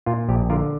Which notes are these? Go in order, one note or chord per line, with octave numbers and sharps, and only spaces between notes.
A#2 F4
A#1 G4
D3 F4 A#4